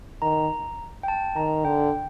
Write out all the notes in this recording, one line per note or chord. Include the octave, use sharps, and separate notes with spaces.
D#3 A#5
G5
A5
D#3 A#5
D3 G5